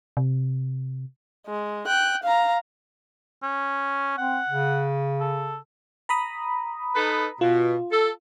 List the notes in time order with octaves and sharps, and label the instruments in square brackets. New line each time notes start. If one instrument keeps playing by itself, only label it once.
[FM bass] C3
[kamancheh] G#3
G5 F#6
F5 A#5
[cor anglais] C#4
[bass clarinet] C4 [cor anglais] F#5
[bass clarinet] C#3
[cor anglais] A4
[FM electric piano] A#5 B5 D#6
[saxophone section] D#4 A4 B4
[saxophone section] B2 [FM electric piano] F4
[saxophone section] A4